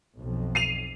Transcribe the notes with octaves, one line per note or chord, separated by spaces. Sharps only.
B1 F2
C7 D#7 F7